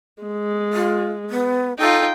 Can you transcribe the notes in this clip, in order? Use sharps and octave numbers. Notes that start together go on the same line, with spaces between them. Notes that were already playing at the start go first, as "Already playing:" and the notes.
G#3
F4
B3
D#4 F4 A4 G5